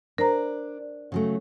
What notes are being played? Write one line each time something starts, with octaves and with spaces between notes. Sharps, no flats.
D4 A#4 C5 A#5
C#3 F#3 A3